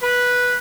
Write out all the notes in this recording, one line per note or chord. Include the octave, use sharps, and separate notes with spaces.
B4